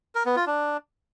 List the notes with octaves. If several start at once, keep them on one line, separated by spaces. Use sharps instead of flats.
A#4
B3
F4
D4